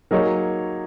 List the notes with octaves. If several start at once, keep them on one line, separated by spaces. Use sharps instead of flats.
F#3 A#3 D#4 G#4 C#5